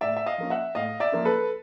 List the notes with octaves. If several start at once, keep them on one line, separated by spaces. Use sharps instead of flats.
A2 D5 E5
E5
D#5 F5
F3 A#3 C#4
E5 F#5
A2 D#5 F5
D5 E5
F3 A#3 C#4
A4 B4